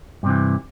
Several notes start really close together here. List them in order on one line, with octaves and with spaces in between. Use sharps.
G2 C3 E3